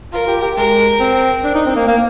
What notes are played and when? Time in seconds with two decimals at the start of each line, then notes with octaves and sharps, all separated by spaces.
0.13 F4 A#4
0.27 G4
0.42 G4
0.57 G#3 A#4
1.00 C4
1.44 D4
1.55 D#4
1.66 C4
1.76 A#3
1.87 A#3